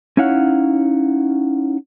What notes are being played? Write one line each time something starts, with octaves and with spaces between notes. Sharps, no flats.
C#4 D#4 E4 C#5 F5 F#5